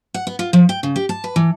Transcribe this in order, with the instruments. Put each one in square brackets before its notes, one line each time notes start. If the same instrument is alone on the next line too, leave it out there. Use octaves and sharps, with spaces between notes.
[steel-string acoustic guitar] F#5
B3
F4
F3
G5
C#3
G4
A5
B4
E3